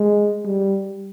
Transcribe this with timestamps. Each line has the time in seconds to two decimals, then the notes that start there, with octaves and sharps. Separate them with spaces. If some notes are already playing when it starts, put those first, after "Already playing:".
Already playing: G#3
0.45 G3